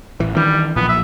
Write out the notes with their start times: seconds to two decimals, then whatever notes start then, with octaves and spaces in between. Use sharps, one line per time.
0.20 A1 E3
0.36 D#3 E3 G3 D4
0.76 B1 A#2 F3 B3
0.89 E5